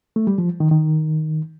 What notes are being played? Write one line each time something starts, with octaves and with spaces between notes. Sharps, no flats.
A3
G3
F3
D#3
D#3